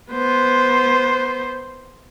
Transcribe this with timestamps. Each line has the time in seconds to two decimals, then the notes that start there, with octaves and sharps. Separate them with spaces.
0.12 B3 C5